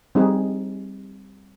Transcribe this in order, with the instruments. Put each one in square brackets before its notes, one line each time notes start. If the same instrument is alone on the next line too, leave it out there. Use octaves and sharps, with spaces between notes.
[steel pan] G3 C4 D#4 G#4